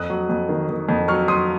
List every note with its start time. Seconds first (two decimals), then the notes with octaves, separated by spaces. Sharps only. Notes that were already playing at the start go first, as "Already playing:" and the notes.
Already playing: F2 D#6 F#6
0.10 F#3
0.29 F2
0.49 D#3
0.69 D#3
0.89 F2
1.08 F#3 C#6 F6
1.28 F#3 C6 D#6